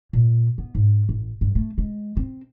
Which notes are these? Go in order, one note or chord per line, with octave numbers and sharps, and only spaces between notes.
A#2
B3
G#2
A1
G2
A3
G#3
C4